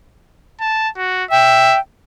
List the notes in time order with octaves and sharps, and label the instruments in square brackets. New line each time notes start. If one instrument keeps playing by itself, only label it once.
[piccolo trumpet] A5
F#4
[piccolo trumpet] E5 [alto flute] G5